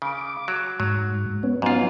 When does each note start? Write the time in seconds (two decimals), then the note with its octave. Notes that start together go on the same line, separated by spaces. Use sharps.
0.02 C#3 D6
0.48 F#3
0.80 G#2 F#3
1.43 B3 C#4
1.62 G#2 F#3 B3 C#4 F4